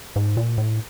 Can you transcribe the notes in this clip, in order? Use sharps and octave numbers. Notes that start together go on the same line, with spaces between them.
G#2
A#2
A2